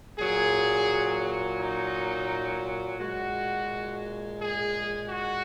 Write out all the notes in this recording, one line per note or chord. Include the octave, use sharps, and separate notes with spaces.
A#2 F#3 G#4
D#4
A#2 G#3 F#4
G#4
F#4